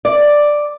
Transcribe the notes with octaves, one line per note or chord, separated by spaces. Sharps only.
D5